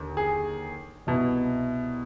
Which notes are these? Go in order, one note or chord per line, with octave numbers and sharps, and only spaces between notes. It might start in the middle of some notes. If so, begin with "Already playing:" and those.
Already playing: D#2 D3
G#4
C2 B2